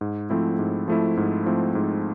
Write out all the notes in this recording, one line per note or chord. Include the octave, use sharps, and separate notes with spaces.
G#2
F3 A3 C4 E4
G#2
F3 A3 C4 E4
G#2
F3 A3 C4 E4
G#2